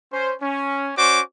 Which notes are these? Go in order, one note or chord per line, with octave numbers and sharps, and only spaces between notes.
C#4 C5
C#4
C#4 F#4 C5 D5 D6